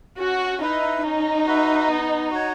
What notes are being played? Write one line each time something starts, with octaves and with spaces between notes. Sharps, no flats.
C#4 F#4
D#4 E4 B4 E5
C#4 D#4
F#4 B4 E5
B3
F#4 C#5